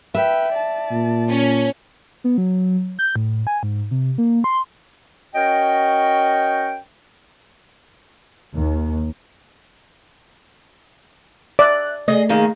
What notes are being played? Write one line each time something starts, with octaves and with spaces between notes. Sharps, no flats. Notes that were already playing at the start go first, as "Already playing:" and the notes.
B4 E5 G5
D5 A5
A#2
C#4
B3
F#3
G6
A2
G#5
G#2
C3
A#3
C6
C#4 F#4 A#4 C#5 D#5 G5
D#2
D5 E5 F#6
A3 G#4 D#5
D#3 A#3 G#4